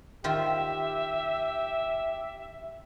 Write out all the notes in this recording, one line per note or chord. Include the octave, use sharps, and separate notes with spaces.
D#3 F4 G4 C5 E5